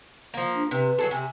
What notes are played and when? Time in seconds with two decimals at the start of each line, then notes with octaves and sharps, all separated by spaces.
0.34 F3 A#3
0.55 D4
0.71 C3 B4
0.98 F#3 G#4 A4
1.11 C3 G#5